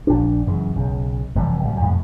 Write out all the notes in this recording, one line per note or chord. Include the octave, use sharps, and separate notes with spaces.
A#1 D4
F#2 C#3 E3
B1 C#3
F1 C3 E3 G3
C#2 A2 F#3 G3
F2 A2 C3